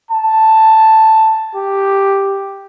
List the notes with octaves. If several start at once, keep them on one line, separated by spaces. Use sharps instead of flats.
A5
G4